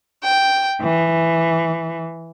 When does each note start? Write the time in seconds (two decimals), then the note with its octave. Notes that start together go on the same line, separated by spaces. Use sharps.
0.24 G5
0.82 E3